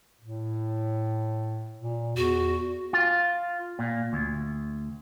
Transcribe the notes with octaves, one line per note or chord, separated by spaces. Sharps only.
A2
A#2
E2 F#4
F4
A#2
D2